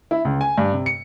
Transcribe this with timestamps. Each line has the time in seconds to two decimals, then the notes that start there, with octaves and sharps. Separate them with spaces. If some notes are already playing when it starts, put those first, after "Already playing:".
0.11 E4
0.25 C#2
0.41 G#5
0.58 G2
0.73 C3
0.86 C#7